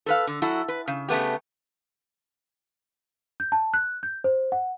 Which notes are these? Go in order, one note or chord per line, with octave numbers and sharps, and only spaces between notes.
A4 B4 F5
D3
F#3 E4 F#4 A4
B4
C#3
C#3 A3 B3 G4
G6
A5
F#6
G6
C5
F#5